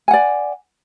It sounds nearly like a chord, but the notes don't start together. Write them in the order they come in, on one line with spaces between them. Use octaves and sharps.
G#5 F#5 D5